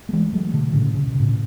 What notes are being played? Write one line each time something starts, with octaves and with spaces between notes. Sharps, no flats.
A3
E3 G#3
F#3 A3
B2 D3
A2 C#3
C#3
B2
A2 C#3